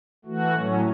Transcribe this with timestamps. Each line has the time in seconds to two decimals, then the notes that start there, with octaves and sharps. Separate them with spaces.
0.25 E3 A3 F#4
0.54 A2 F#3 C#4